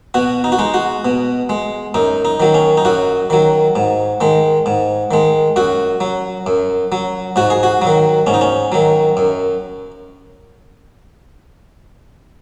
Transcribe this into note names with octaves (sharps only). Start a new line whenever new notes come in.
B2 F#4
D#4
F#4
G#3 D#4
F#4
B2
G#3
F#2 D#4
D#4
D#3 F#3
C#4
D#4
F#2 F#4
D#3 F#3
G#2
D#3 G#3
G#2
D#3 G#3
F#2 F#4
F#3
F#2
F#3
G#2 F#4
G#4
F#4
D#3 F#3
G#2 C#4
D#4
C#4
D#3 F#3
F#2